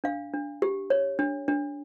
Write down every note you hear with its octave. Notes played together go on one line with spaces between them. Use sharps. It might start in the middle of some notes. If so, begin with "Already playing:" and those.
D4 F5
D4
G4
C#5
D4
D4